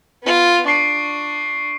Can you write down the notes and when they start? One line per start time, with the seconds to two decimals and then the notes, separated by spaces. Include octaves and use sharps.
0.23 B3 F4
0.66 D4 C#6 C7 D7